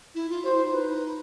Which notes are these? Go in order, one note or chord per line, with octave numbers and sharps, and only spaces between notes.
E4
F4
F#4 C5
E4
D#4
B4